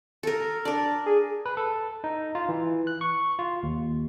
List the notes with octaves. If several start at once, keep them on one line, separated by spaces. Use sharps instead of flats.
A4 A#4
D4 A#4 D5
G#4
B4
A4
D#4
F4
E3
F#6
C#6
F4
D#2